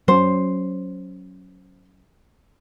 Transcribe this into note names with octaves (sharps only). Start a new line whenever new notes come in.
F#3 C#4 C5